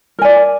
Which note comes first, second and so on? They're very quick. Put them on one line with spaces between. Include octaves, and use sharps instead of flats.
A#4 G#5 D5